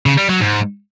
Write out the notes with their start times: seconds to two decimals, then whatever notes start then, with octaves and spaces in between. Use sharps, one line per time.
0.06 C#3
0.17 G3
0.29 F#3
0.40 G#2